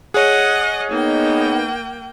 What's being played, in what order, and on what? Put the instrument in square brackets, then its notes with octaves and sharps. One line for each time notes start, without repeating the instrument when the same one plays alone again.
[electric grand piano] G#4 C#5 [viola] D#5 F#5
[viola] A#3 G5 [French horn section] B3 D#4